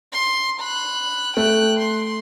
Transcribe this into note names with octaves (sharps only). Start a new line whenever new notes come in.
C6
B5 F#6
A3 G5 F#6
C6